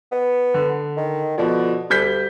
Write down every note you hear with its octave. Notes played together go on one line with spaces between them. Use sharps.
B3
D3
D#3
B2 D3 F3
D2 G3 G6 B6